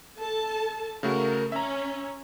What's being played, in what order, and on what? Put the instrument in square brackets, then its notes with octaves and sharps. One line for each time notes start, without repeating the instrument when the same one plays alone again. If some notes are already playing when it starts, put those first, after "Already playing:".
[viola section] A4 A5
[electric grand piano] C#3 A3 F#4 [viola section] A#4
[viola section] C#4 [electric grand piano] E5 A#5